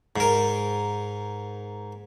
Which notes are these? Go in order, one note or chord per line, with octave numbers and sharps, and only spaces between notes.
G#2 A#4